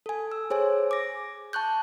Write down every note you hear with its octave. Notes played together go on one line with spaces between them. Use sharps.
A4 G#5
E6
G#4 C5 C#5 G#5
D6 A#6
A5 C#6 F#6 G6